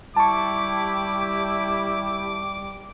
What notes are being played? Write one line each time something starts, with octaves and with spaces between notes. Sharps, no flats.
G3 E4 G4 A5 C#6 D6